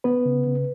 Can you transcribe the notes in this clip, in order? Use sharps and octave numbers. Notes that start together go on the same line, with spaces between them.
B3 B4
C#3
C#3